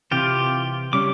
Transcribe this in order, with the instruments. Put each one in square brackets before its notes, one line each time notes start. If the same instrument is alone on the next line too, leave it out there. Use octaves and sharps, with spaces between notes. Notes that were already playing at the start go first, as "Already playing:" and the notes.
[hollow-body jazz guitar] C3 E3 [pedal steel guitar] F4 G4
[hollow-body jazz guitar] C#3 G3 C#4 [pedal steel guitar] D6